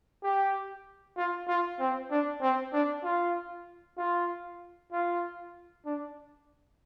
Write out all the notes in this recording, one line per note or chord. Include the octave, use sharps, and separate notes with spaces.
G4
F4
F4
C4
D4
C4
D4
F4
F4
F4
D4